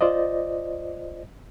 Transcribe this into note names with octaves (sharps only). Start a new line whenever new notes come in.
F4 C5 D5 D#5